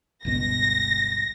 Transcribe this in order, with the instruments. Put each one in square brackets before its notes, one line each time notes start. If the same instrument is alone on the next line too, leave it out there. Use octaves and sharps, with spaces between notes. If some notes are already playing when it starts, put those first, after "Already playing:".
[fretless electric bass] G1 C#2 B2 [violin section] A#6